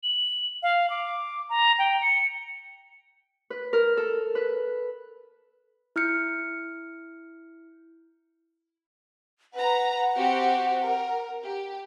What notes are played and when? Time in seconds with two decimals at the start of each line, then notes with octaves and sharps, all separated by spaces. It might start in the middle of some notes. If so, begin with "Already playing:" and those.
0.03 F#7
0.63 F5
0.90 D6
1.49 A#5
1.79 G5
2.02 C#7
3.50 B4
3.73 A#4
3.97 A4
4.35 B4
5.96 E4 F6 G6 C#7
9.54 B4 F#5 A#5
10.17 C4 F#4 G4
10.84 A#4
11.44 G4